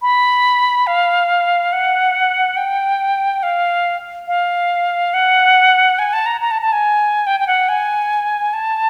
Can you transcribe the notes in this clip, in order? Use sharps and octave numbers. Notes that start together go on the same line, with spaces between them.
B5
F5
F#5
G5
F5
F5
F#5
G#5
A5
A#5
A#5
A5
A5
G#5
G5
G5
F#5
G#5
A5